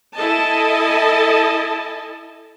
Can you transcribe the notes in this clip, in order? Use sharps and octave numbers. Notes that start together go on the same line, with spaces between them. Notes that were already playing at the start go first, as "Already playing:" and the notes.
E4 A4 D#5 G#5 A5